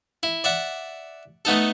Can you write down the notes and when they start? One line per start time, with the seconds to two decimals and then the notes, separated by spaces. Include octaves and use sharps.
0.23 E4
0.44 D5 E5 F#5
1.45 A3 B3 D#4 A4